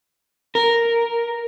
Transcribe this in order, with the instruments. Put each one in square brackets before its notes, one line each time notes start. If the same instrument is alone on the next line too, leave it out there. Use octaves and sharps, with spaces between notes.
[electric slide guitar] A#4